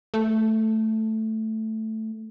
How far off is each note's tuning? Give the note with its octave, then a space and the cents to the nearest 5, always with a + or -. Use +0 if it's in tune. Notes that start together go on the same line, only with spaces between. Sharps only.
A3 +0